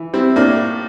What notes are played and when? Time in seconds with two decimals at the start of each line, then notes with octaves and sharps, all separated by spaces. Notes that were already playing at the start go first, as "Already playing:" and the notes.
Already playing: E3
0.13 G3 C4 E4
0.36 A2 A#3 D4